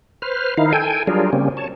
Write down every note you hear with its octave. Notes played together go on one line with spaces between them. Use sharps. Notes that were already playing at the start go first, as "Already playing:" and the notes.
B4 C5 F6
D#3 D#4 E4 F5
A4 G5 G#5
F#3 G3 D4 F4 G#4 A#4
C#3 G3 A#3 C4 C#4
C#5 A5